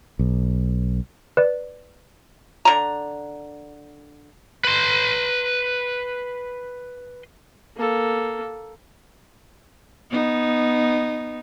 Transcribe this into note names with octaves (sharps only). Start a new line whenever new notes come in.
B1
B4 D5
D3 A#5
B4 C6
A#3 A4
B3 D#4